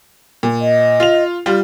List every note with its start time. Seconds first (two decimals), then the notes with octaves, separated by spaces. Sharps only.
0.43 A#2
0.61 D#5
1.00 F4 F7
1.46 G3 F4